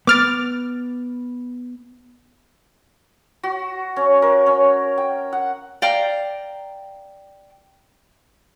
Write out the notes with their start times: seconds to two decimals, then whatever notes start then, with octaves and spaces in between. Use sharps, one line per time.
0.07 B3 D6 F6 A6
3.43 F#4
3.96 C#4
4.22 A#4
4.46 C#4
4.98 G5
5.33 F#5
5.82 D5 F5 G5 A#5